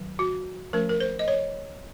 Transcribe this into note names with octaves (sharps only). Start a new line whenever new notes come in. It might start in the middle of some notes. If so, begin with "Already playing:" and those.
Already playing: D#3 F#3
F#4
F3 A3 C#4 A#4
A#4
C5
D#5
C#5